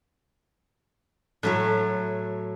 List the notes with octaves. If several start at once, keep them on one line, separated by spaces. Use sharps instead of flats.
A2 F#3 A3